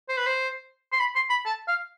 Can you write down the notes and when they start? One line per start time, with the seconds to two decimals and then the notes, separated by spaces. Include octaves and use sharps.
0.09 C5
0.17 B4
0.27 C5
0.92 C6
1.00 B5
1.16 C6
1.30 B5
1.45 A5
1.68 F5